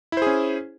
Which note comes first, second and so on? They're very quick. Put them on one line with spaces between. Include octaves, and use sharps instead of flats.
E4 C5 G#4 C#4